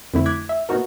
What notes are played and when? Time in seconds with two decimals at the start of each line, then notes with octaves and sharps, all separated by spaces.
0.14 F2 D3 A3 E4
0.26 D6 F#6 G#6 B6
0.49 E5
0.69 A#2 B3 D#4 F#4 A#4